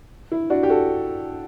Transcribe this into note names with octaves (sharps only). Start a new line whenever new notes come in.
E4
D4 F#4
G4
F#4 A4